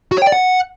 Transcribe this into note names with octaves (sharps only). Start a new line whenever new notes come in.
F#4
C#5
G5
D5
F#5